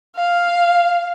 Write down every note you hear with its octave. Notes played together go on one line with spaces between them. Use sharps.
F5